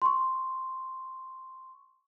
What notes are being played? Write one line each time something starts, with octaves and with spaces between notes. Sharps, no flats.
C6 C#6